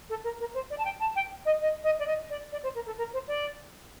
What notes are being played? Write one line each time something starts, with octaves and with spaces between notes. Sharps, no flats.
A4
A#4
A#4
C5
D5
A5
G5
A5
G5
D#5
D#5
D#5
D5
D#5
D5
D5
C5
A#4
A4
A#4
C5
D5